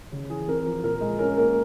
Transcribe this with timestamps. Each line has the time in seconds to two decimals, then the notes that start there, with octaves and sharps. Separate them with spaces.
0.12 C#3
0.30 E3 G#4
0.48 C4 A#4
0.66 F3
0.83 A#2 A#4
1.01 G#3
1.19 C#4 A#4
1.37 A#3 A#4